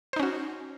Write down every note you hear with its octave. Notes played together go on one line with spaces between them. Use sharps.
C#4 D#4 F#4 C5